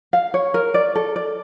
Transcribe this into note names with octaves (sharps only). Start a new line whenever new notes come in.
F5
C#5
A#4
D5
A4
D5